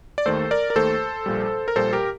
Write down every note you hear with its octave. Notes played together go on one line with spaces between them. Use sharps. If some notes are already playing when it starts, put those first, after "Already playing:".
D5
D#2 D#3 A3 A4 C5
A#4 D5
A#4
D#2 D#3 A3 A4 C5
A#1 A#2 G3
A#4
A#1 A#2 G3 A4 C5
G4 A#4